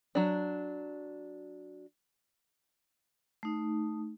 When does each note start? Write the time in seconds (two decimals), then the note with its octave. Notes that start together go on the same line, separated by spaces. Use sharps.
0.15 F#3 D4
3.43 A3 D#4